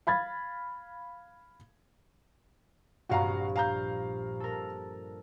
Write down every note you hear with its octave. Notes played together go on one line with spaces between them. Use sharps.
F5 B5 G#6 A6
A#1 G2 A#2 F#4 F5 A#5
F5 A#5 G6
A4 A#4